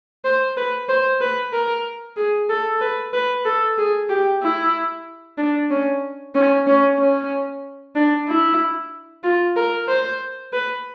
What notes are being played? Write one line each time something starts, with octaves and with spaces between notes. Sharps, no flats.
C5
B4
C5
B4
A#4
G#4
A4
B4
B4
A4
G#4
G4
E4
D4
C#4
C#4
C#4
C#4
D4
E4
F4
A#4
C5
B4